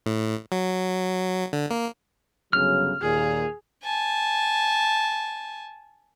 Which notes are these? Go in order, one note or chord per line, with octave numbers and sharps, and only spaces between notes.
A2
F#3
D3
A#3
G1 C#3 F#3 F6
D#2 A#2 G#4
G#5 A5